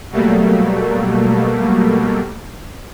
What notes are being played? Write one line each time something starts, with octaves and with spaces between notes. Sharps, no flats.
B2 F#3 G3 A3 A#3